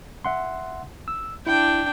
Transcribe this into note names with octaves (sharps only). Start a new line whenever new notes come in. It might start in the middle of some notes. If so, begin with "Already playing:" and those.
E5 F#5 C6
E6
D4 E4 G5